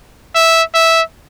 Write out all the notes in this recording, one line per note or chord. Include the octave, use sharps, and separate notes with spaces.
E5
E5